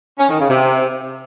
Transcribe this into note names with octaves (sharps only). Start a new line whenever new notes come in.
C#4
D#3
C#3
C3